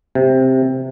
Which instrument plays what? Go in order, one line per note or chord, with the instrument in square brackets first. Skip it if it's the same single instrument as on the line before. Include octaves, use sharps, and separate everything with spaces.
[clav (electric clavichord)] C3